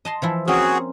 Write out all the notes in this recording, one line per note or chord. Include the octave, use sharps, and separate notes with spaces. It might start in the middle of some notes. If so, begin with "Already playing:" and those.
D#5 A5 C6
E3 F3 E4
A#3 C4 C#4 F#4 G#4